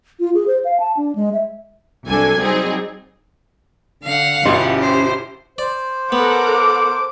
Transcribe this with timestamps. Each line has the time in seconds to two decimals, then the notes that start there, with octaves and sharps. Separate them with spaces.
0.20 F4
0.34 G#4
0.47 C5
0.65 F5
0.80 A5
0.97 D4
1.15 G#3
1.33 E5
2.07 C2 F#3 D4 A4 G#5 G#6
2.41 F#3 G3 C4 D#4 G#4
4.03 D3 F5 F#5
4.46 G1 B2 C#4 E4 F4 G4 D#5 C6
4.82 C5
5.58 C5 D5
6.12 B3 A4 A#4 F#5 D6